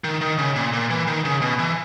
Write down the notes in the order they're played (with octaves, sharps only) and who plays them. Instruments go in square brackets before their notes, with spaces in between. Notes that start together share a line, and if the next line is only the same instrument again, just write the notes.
[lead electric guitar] D#3
D#3
C#3
A#2
A#2
E3
D#3
C#3
B2
E3